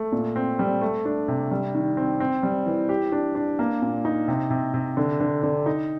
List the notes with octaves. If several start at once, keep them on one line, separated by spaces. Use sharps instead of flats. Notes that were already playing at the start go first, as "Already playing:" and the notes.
Already playing: A3
A#2
C4
G3
A3
D4
C3
G3
D#3
C4
C4
G3
E3
G4
D4
D4
A#3
A#2
D#4
C3
C3
C3
D3
D3
D3
D#4